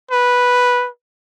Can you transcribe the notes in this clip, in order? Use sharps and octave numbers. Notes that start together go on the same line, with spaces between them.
B4